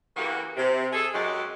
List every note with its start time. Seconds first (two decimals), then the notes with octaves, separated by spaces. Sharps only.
0.16 C#3 E3 A#3 B3 F#4 G4
0.57 C3
0.93 G#4 A4
1.14 F#2 G#3 G4